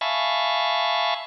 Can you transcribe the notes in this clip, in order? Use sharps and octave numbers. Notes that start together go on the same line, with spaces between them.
E5 F5 G#5 A5 B5 C#6